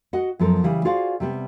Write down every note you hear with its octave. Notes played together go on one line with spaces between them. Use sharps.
F#4 D#5 F#5
F#2 F3 B3 A4 A#4
C#3 E3 G3
F4 F#4 G#4 C5 D5 F5
C3 G3 B3